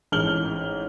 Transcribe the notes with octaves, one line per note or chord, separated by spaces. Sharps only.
A1 G#2 F6 F#7 G7